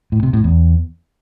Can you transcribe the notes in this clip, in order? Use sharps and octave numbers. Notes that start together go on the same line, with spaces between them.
A2
C3
A2
E2